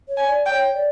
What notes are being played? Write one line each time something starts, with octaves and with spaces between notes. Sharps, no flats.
C#5
G#5
D5
D5 G5
C#5
D5